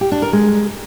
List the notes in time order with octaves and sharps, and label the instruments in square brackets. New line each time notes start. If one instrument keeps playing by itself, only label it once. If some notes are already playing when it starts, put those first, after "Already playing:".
[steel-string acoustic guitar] G4
D4
A#4
G#3